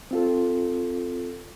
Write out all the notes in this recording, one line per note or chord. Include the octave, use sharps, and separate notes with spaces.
C4 F4 A4